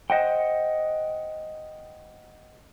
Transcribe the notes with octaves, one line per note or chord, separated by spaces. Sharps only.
C5 D#5 F#5 G5